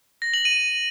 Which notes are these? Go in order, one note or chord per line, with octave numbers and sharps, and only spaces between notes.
A#6
F#7
D#7